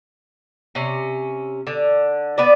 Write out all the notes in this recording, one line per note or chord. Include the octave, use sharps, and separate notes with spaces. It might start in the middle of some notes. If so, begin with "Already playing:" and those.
C3 C#4
D3
B3 B4 D5